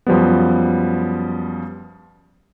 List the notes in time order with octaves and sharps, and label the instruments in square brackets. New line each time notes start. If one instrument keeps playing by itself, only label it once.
[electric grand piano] F#2 F3 G3 B3